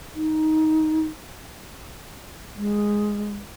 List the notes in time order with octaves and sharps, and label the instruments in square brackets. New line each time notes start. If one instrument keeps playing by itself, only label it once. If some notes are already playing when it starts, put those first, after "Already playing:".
[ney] D#4
G#3